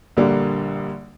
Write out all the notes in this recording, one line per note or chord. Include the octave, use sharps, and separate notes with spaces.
A#1 D3 G3 A#3